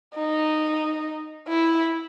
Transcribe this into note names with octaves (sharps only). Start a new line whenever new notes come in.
D#4
E4